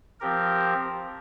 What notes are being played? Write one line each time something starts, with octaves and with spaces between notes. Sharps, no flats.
F3 C4 G4 A#4